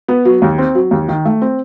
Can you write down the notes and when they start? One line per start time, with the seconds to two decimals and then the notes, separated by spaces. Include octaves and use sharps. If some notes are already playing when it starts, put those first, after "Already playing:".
0.08 B3
0.25 F#3
0.42 D#2
0.58 C4
0.75 F#3
0.91 D#2
1.08 D#3
1.25 A3
1.41 C4